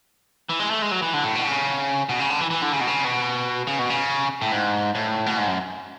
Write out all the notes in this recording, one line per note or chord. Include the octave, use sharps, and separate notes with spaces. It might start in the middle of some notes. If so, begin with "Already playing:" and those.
E3
G#3
A3
G#3
F#3
E3
D3
A2
B2
C#3
B2
C#3
D3
E3
E3
D3
C#3
B2
C#3
B2
C#3
B2
C#3
A2
G#2
A2
B2
G#2
F#2